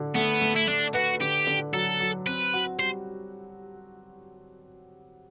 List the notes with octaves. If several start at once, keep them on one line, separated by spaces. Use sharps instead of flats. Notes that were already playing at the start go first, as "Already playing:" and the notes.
Already playing: D3
A3 B3
A3
E4
A3 D4
F#4 B4
D3 G4
D3
F#3 A4
F#3
C4 B4
F#4
G3 C5